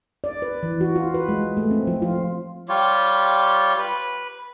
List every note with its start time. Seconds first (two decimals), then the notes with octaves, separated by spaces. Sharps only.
0.24 D5
0.42 B4
0.63 E3
0.81 F#4
0.96 F4
1.14 B4
1.29 G#3
1.57 A3
1.71 C4
1.87 F3
2.02 F4
2.69 G3 F4 G4 C#5
3.78 B4